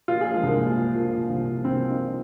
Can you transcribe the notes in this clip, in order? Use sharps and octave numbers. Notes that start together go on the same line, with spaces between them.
A#2 F4
F3 G#4
G#3
C2 A#3
A#2
F3
A#2
A#2
C2
F3
C2 C4
F3
D#4
F3